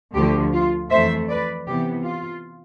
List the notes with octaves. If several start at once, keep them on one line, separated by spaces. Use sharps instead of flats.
D2 D3 F3 A3 G4
F4
F2 E3 A3 C5 E5
B4 D5
C3 E3 B3 G4
F4